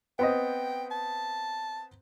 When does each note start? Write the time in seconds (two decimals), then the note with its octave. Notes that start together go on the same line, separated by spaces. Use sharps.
0.19 B3 C4 D#5 G5
0.91 A5